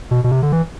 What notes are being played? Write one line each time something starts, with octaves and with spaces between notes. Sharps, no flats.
B2
B2
C3
D3
E3